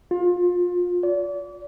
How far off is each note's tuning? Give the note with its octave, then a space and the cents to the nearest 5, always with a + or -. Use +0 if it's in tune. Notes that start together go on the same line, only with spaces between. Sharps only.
F4 +25
D5 -35